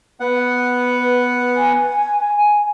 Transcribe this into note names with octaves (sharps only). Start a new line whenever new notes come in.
B3 F#5
B4
G#5